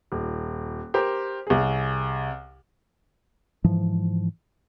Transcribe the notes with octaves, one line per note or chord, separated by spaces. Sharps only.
D#1
G4 A#4 C5
C2 G#4
G#2 E3 F3